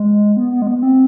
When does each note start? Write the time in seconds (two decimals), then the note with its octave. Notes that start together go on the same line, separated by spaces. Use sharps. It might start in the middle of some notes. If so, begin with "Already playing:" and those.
Already playing: G#3
0.37 B3
0.52 B3
0.62 G#3
0.67 B3
0.83 C4